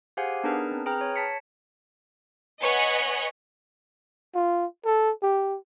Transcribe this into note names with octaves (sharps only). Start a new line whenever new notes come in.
G4 G#4 C5 F5 F#5 G#5
B3 D4 D#4 G#4 A#4 B4
C4
G#4 B4 G5 A#5 F6
C#5
A5 B6 C#7
B4 C#5 D#5 F#5 G#5
F4
A4
G4